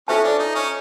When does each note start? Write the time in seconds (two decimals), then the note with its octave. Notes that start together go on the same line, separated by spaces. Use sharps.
0.08 C#4 F4 A4 C5 E5 A5
0.24 D4
0.39 D#4
0.55 C#4